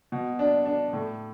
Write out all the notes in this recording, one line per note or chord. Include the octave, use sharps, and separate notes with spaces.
B2
D4
D4
A2